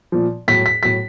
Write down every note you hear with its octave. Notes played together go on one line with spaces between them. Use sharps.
A#2 F3
A2 F#3 B6
B6
A2 F#3 B6